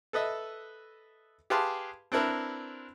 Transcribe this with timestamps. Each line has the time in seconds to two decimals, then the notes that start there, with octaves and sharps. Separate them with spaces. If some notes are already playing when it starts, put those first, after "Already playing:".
0.13 A4 B4 D#5 E5
1.50 G4 G#4 B4 F5 A5 C6
2.12 C4 D4 E4 A#4 B4